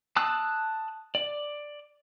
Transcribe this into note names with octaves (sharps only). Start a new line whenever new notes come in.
A5 D#6 E6 F#6
D5